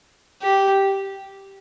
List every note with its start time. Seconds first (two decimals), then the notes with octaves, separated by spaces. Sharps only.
0.42 G4